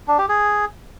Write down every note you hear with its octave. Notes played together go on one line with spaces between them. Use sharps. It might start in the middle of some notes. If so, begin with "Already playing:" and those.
D4
G4
G#4